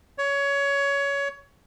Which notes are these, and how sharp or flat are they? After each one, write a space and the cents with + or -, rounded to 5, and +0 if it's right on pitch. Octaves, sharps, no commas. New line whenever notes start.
C#5 +20